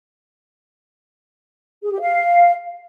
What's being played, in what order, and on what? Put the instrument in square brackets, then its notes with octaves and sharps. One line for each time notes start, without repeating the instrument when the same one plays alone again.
[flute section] G#4
G4
F5